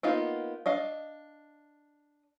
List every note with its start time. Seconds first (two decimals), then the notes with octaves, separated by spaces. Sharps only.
0.03 A#3 B3 D#4 F4
0.66 D4 D#5 F5